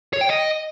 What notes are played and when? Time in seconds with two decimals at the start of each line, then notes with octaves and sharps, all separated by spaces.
0.13 C#5
0.21 G5
0.29 D#5